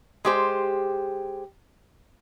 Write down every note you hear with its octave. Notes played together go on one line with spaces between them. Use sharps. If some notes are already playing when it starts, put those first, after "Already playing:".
G#3 G4 C5